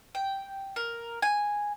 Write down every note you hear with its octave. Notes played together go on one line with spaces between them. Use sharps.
G5
A#4
G#5